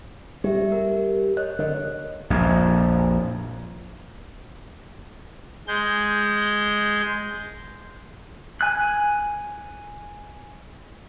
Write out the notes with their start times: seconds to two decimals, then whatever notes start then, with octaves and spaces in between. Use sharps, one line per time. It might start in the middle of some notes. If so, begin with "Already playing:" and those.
0.44 G3 G4 E5
0.72 A#4
1.37 C#5 D#5 F#6
1.59 D3 A#4 D#5
2.30 A#1 F2
5.68 G#3 G6
8.61 G#5 F#6